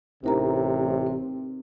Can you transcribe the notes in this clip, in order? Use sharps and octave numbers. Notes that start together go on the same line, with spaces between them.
A1 C3 D#4 A#4 A#5
C4